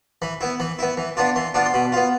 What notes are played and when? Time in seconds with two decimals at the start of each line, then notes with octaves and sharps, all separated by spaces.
0.22 E3 B5
0.41 B3 E4
0.60 E3 B5
0.79 B3 E4
0.97 E3
1.17 B3 D4 F4
1.36 E3 C6
1.54 B3 D4 F4
1.65 C6
1.74 B2 B5
1.92 B3 F4